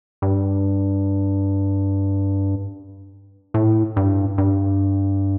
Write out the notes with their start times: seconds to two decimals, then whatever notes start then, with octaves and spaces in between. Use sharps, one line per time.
0.22 G2
3.54 A2
3.96 G2
4.38 G2